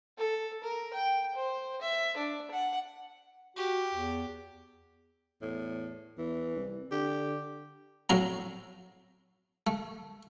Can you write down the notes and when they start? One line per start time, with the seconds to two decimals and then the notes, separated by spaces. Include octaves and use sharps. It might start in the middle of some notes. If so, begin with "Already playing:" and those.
0.18 A4
0.63 A#4
0.93 G5
1.35 C5
1.82 E5
2.17 D4
2.51 F#5
3.57 F#4 G4
3.95 E2
5.42 E2 A2
6.18 E2 E3
6.57 C2
6.91 D3 G4
8.09 A2 F#3 C4 A#5
9.67 A3